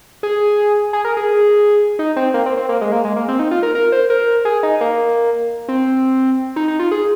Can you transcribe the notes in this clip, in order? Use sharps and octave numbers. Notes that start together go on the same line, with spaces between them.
G#4
G#4
A#4
G#4
D#4
C4
A#3
C4
C4
A#3
G#3
A#3
G#3
A#3
C4
D#4
F4
A#4
A#4
C5
A#4
G#4
D#4
A#3
C4
D#4
D#4
F4
G#4